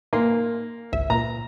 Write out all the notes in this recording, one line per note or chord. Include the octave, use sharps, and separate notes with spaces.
A#3 D#4 G#5 C6
G#1 C#2 E5
A#2 A#5